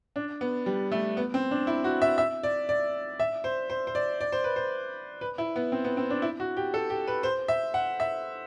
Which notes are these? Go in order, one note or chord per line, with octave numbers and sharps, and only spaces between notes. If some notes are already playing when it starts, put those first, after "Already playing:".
D4
B3
G3
A3
B3
C4
D4
E4
F#4
E5
E5
D5
D5
E5
C5
C5
C5
D5
D5
C5
B4
C5
B4
E4
B3
C4
B3
C4
D4
E4
F#4
G4
A4
G4
B4
C5
E5
F#5
E5